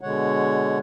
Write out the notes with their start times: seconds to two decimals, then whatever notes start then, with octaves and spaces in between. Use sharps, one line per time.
0.01 B2 D3 G#3 C#5 F#5